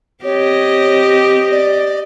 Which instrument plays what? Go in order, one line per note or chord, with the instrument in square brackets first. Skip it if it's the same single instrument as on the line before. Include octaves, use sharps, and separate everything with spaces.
[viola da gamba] C4 G4 D#5 [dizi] C#5
[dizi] D5